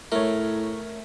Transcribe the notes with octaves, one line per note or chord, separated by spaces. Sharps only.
A2 A3 A#4 C#5